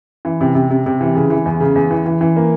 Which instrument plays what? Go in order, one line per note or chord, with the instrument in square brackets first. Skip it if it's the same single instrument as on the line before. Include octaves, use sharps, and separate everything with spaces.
[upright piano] E3
C3
C3
C3
C3
E3
C#3
E3
E2
C#3
E2
E3
E3
E3
A#3